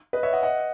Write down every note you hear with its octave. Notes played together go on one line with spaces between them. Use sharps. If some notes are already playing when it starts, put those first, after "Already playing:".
B4 D#5
C#5 E5
D#5 F#5
D#5 F#5